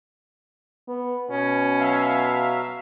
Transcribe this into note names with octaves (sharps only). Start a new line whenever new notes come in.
B3
B2 C#4
F#3 E5 F5